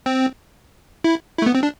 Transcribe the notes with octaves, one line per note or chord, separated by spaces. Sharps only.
C4
E4
E4
A3
B3
C4
D4